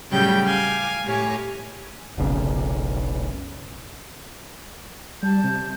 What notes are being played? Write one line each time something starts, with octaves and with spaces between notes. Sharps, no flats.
A2 C#3 F#3 G3 G5 G6
F5 G#5 D6
A2 G4 C#5 G#5
F1 B1 C#3
G3 A5 G6
C3